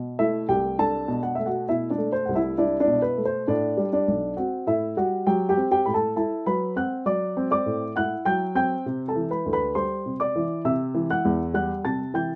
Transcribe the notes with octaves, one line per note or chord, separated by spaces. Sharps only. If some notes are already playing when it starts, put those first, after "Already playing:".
Already playing: B2
A3 E4 E5
C2 G4 G5
D4 A4 A5
B2
F#5
A3 E5
F#4 F#5
B2 E4 E5
D4 D5
A3
C5
C2 F#5
E4 E5
D4 E4 D5
D4 D5
B2
B4
A3
C5
A2 D4 D5
G3
D4 D5
B1
C4 F#4 F#5
A2 E4 E5
G3 F#4 F#5
F#3 G4 G5
G4 G5
C4
G4 G5
A2 B5
A4 A5
E4 A4 A5
F#3 B4 B5
C4 F#5 F#6
F#3 D5 D6
C4
D5 D6
A2
E4 F#5 F#6
F#3 G5 G6
C4 G5 G6
C3
A4 A5
E3
B4 B5
D2
B4 B5
G3 C5 C6
C3
D5 D6
E3
C3 E5 E6
E3
F#5 F#6
E2
G3 F#5 F#6
C3 A5 A6
E3 G5 G6